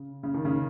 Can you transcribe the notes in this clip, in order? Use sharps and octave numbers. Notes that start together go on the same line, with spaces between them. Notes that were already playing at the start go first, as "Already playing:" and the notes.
Already playing: C#3
C#3
D#3
C#3